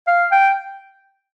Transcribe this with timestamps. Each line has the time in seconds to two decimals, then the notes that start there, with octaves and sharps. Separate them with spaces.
0.07 F5
0.31 G5